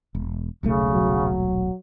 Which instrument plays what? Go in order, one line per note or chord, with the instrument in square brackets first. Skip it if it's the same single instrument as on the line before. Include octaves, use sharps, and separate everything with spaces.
[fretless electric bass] E1
[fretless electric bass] D#1 B1 A3 [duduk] C#3
[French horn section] F#3